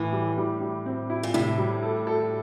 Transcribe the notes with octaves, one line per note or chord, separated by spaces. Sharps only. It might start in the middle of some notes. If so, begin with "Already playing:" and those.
Already playing: A2 E3
G3
G3
G3
C4
E4
A#2
A2 C3
G3
A4
A4